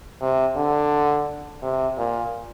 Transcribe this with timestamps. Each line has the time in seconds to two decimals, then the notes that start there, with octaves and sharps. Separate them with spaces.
0.21 C3
0.56 D3
1.63 C3
1.98 A#2